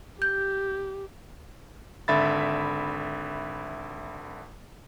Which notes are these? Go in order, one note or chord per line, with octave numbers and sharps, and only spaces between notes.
G4 G6
G#1 D3 E5 B5 A6